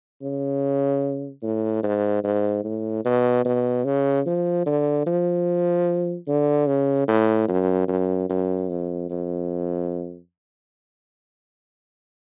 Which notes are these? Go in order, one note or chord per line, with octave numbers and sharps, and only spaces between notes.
C#3
A2
G#2
G#2
A2
B2
B2
C#3
F3
D3
F3
D3
C#3
A2
F#2
F#2
F#2
F2
F2